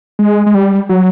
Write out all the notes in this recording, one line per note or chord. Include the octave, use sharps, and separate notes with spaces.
G#3
G#3
G3
F#3